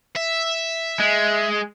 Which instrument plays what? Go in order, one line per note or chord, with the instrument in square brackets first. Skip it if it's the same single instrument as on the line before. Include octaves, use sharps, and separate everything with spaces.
[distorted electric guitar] E5
[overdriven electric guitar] G#3